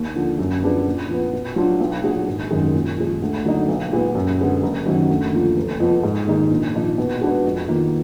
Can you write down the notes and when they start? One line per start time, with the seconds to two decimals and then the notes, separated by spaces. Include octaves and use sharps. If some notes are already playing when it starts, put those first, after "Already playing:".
Already playing: D#2
0.16 D3 F3
0.39 F#2
0.63 F3 B3 D4 G#4
0.86 A#2
1.09 F3 B3
1.33 B2
1.56 F#3 D4 F4
1.80 B1
2.03 A#2 F#3 D4 G#4
2.27 G#1
2.51 F#2 D#3 G#3
2.74 A#2
2.98 F3 G#3
3.22 D2
3.45 D3 F#3 A#3 D#4
3.69 B1
3.92 A#2 G#3 B3
4.15 F#2
4.39 D3 G#3 B3
4.63 F#1
4.86 F#2 D#3 F#3
5.10 D2
5.32 D3 F3 A#3 F4
5.57 F1
5.80 F2 F3 B3
6.03 G#2
6.27 D#3 A#3 D#4 G#4
6.51 A#1
6.73 A#2 F3 A#3 D#4
6.98 B2
7.21 G#3 D4 F#4 B4
7.45 F2
7.68 D#3 A#3 F4